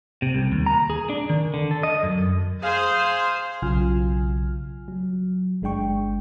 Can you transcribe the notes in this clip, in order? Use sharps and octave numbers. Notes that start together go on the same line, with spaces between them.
C3
C2
D#2
A#5
G#4
D4
D#3
D3
A4
D#5
F#2
G#4 C5 F5
B1 C#3 F#3 F4 G#5 F6
F#3
G1 G#3 D4 G5 C#6